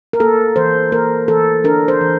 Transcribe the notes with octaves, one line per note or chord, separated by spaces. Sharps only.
A#4
A#3 A4
E3 C5
A#3 A#4
E3 A4
D4 A#4
C5
E3